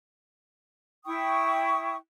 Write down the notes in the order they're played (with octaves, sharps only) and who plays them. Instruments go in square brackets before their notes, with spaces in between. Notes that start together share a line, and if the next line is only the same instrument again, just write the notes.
[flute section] E4 G5 C#6 D#6